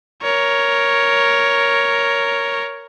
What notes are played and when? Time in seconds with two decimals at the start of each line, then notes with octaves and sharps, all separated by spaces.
0.22 A#4 C#5